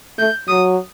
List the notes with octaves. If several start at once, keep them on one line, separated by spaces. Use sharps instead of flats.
A3 G6
F#3 D#6